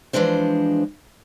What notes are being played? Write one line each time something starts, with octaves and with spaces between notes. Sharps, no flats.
E3 F3 G#3 D4 C5